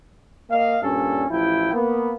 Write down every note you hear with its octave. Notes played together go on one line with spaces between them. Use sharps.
A#3 D#5 F5
G2 A#2 C#4 A4
A1 F3 E4 G5
A#3 B3